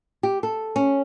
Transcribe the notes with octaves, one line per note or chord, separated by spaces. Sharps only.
G4
A4
C#4